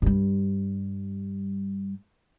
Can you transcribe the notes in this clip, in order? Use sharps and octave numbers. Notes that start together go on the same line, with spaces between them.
G2 G3